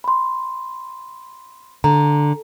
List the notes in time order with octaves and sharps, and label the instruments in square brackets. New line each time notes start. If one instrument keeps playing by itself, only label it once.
[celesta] B5 C6
[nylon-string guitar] D3 [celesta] A#5